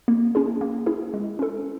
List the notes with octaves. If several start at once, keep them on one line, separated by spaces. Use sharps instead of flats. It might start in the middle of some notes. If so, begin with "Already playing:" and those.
A#3
C#4 E4 G#4
A#3
C#4 E4 G#4
G#3
C#4 E4 A4